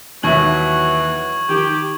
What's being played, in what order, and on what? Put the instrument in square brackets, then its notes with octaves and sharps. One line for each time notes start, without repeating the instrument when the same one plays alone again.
[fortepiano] D#2 E5 [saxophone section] E3 F#3 [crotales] C#6 G#6 F#7
[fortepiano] D#3 [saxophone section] G4